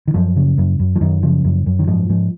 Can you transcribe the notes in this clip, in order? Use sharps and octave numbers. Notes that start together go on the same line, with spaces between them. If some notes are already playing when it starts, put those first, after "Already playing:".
D#3
F#2 F3
C#3
F#2
F#2
F3
F#2 D#3
C#3 F3
F#2
F#2
D#3
G#2 F3
G#2 F3